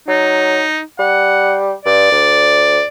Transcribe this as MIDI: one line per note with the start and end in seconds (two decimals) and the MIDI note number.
0.08 0.63 54
0.08 0.80 63
0.99 1.73 55
0.99 1.56 78
1.85 2.07 43
1.85 2.88 74
2.11 2.80 38